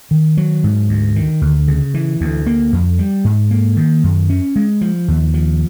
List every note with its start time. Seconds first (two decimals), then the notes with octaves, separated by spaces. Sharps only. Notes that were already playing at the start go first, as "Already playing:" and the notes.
0.11 D#3
0.37 F#3
0.64 G#2
0.89 D2
1.16 D#3
1.42 D2
1.68 C#3
1.94 E3
2.21 D2
2.47 A#3
2.73 F2
2.99 G3
3.24 G#2
3.51 A#3
3.77 D#3
4.04 F#2
4.30 C#4
4.56 G#3
4.81 F3
5.08 D#2
5.34 F3